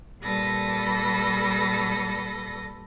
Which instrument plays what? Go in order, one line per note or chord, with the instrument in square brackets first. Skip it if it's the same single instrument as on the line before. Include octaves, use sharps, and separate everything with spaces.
[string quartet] A#2 G3 A4 B4 A#6